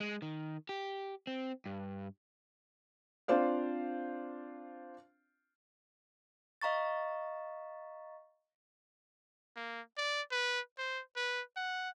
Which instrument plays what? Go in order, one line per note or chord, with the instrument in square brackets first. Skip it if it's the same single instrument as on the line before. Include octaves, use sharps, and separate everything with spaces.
[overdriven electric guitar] G#3
D#3
G4
C4
G2
[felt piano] C4 D4 F4 C5 D5 F5
[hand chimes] D#5 F5 A#5 C#6 A6
[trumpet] A#3
D5
B4
C5
B4
F#5